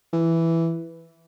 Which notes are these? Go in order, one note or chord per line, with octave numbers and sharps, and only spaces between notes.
E3